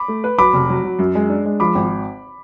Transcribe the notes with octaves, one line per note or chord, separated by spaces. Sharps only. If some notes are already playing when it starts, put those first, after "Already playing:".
Already playing: B5 D6
A3
B4
F#3 B5 D6
F1
F#3
F#3
F#2
G#3
D4
G#3
F3 B5 D6
G#1